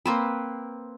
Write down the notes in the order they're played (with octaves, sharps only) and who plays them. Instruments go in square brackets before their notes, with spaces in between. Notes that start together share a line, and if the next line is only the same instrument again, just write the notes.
[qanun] A#3 C4 B4